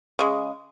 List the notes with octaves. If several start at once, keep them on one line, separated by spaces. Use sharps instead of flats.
C#3 G#3